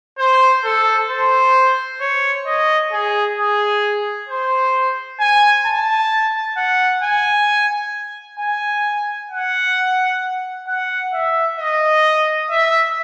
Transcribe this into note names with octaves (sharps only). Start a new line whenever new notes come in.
C5
A4
C5
C#5
D#5
G#4
G#4
C5
G#5
A5
F#5
G#5
G#5
F#5
F#5
E5
D#5
E5